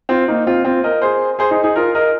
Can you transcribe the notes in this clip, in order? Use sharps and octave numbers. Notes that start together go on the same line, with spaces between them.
C4 F4
A#3 D#4
C4 F4
C4 F4
A#4 D#5
G#4 C5
G#4 C5
D#4 G#4
D#4 G#4
F4 A#4
A#4 D#5